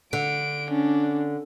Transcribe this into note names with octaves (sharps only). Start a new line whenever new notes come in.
D3 D7
C#4 D4